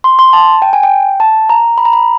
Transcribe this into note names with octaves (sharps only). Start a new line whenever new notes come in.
C6
C6
A5
G5
G#5
G5
A5
A#5
B5
A#5
B5